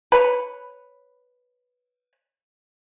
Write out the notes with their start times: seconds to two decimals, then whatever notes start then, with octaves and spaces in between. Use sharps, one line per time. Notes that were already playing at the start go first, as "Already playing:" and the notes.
0.12 B4 C#5